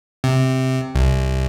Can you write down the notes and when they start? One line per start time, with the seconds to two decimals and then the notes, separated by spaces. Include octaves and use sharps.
0.24 C3
0.95 C2